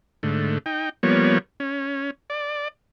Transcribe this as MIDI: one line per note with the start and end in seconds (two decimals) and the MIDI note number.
0.23 0.58 44
0.23 0.58 50
0.23 0.58 57
0.66 0.89 63
0.66 0.89 79
1.03 1.38 53
1.03 1.38 55
1.03 1.38 58
1.03 1.38 59
1.03 1.38 73
1.60 2.11 61
2.30 2.68 74